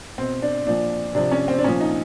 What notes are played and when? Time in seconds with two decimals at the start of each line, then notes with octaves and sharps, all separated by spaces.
0.18 B2 C4
0.42 D4
0.66 A#2 F3 D4
1.15 C3 F3 D4
1.31 C#4
1.48 C4
1.59 D4
1.64 A#2 F3 C#4
1.80 D#4